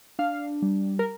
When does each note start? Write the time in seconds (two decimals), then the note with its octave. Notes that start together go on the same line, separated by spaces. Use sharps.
0.19 D4 F5
0.62 G3
0.99 A#4